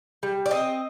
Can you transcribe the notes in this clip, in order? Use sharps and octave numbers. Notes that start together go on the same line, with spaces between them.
G3
D5
C4 D#5